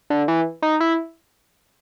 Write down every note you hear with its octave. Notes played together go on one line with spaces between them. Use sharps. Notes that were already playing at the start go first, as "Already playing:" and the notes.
D3
E3
D#4
E4